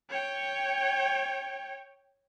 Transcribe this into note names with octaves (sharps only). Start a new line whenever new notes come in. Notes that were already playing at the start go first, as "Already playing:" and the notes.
C#5 G5